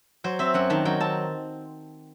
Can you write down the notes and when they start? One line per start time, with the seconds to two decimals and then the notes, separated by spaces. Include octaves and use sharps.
0.24 F#3 C5
0.39 C4 E5
0.54 F#2 F#5
0.70 D#3 A5
0.85 F#3 G5
1.00 C4 A5